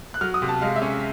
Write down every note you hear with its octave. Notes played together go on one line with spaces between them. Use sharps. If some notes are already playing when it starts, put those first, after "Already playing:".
F#6
F#3 F6
D#6
C3
A5
G#3 F5
E5
C#4